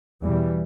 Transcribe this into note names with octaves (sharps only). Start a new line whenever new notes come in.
E2 B2 E3 G3